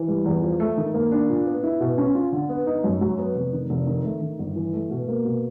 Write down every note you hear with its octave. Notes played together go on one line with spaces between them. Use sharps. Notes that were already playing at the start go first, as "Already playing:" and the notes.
Already playing: E3
G3
E2
F3
A3
D#3
A#3
D4
A#2
B3
E4
B2
C#4
F4
D3
B3
D#4
F#2
F#3
B3
F1
D#3
F1
D#3
A3
D#3
G1
E3
A3
B2
A#3
B2